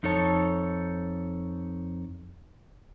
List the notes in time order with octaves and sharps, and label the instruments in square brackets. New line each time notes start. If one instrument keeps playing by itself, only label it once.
[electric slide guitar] F2 D#4 A4 C#5 A5